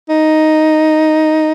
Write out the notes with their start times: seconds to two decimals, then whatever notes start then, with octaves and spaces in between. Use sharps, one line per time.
0.09 D#4